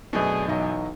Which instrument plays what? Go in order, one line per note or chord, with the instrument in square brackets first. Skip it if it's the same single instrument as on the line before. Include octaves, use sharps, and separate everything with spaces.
[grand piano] F#2 B2 [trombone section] A3 D4 G#4
[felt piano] B1 D#5 [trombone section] E3 F#3